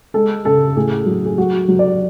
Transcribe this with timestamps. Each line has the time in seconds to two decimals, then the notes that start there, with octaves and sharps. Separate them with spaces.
0.14 G#3 A4
0.45 C#3 A4
0.76 A2 G#4
1.06 F#3
1.26 G#4
1.38 F#3 F#4
1.68 F#3
1.79 D5